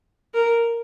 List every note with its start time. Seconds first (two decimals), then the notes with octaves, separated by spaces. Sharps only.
0.34 A#4